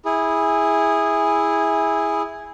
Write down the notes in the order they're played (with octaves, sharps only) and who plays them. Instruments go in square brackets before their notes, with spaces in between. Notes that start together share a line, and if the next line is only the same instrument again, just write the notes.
[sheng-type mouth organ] E4 G#4